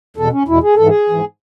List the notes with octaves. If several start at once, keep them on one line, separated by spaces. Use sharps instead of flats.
E2 B2 A4
C#4
E2 B2 E4
G#4
G#2 E3 A4
G#4
G#2 E3